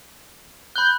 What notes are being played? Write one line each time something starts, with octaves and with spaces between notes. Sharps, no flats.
B5 F#6 G6